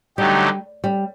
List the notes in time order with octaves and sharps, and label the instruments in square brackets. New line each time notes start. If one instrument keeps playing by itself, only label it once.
[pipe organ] D3 F#3 A3 D#4 G4 [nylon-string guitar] G3
[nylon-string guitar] G3